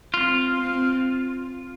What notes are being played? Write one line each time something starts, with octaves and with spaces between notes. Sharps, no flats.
C4 F4
C4